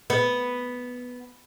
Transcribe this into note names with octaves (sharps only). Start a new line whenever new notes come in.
B3